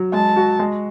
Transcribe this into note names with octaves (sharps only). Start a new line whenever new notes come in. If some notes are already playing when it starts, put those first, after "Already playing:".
Already playing: F#3
G#3 A5
F#4
G#3